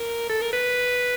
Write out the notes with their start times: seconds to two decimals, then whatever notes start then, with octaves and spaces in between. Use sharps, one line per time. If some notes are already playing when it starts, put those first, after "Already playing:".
Already playing: A#4
0.30 A4
0.41 A#4
0.53 B4